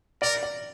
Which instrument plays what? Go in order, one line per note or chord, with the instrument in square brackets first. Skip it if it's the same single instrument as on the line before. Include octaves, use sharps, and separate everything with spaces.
[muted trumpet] A#4 [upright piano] D5
[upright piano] D5